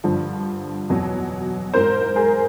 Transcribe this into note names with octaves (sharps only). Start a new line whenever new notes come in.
G2 D3 F3
E2 B2 F#3
G#2 E3 A#4 C5
G#4 A#4